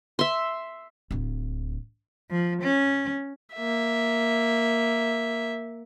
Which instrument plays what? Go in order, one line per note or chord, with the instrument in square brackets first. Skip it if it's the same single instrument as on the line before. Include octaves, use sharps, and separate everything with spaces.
[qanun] E5 C6
[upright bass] D1 D2
[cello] F3
C#4
[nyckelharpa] A#3 E5